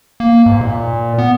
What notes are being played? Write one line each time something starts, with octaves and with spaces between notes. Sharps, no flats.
A#3
G#2
A#2
B3